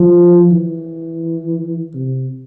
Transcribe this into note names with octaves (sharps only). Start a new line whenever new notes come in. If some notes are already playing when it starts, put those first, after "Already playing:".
Already playing: F3
E3
C3